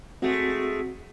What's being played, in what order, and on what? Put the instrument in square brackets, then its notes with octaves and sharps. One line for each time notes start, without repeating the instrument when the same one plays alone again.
[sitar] G#3 A3 [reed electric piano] C4 F#4